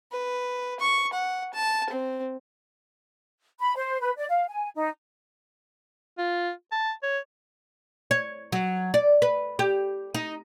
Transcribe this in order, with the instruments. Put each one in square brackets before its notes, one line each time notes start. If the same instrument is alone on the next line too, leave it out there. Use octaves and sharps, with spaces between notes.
[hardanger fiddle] B4
C#6
F#5
A5
C4
[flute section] B5
C5
B4
D5
F5
G#5
D#4
[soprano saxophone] F4
A5
C#5
[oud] C#5
F#3
D5
B4
G4
D#4